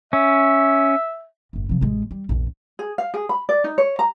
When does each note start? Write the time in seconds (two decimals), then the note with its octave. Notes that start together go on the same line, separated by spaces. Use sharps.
0.13 C#4 E5
1.53 F#1 A2
1.69 C3 F3
1.81 A1 G#3
2.11 G3
2.29 A#1 E2
2.79 G#4
2.98 F5
3.14 G#4
3.29 B5
3.49 D5
3.64 D#4
3.78 C#5
3.99 A#5